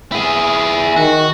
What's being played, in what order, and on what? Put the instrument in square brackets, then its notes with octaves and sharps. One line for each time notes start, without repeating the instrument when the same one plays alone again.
[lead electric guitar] E4 G#4
[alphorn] D#3 [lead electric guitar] F#4